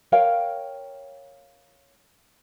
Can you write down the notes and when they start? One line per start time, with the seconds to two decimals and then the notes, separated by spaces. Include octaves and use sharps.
0.12 A#4 C#5 F5 G5